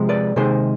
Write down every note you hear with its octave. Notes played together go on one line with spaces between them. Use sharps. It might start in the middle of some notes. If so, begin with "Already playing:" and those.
Already playing: C3 F3 G#3
B4 D5
C3 D#3 G#3 G#4 C5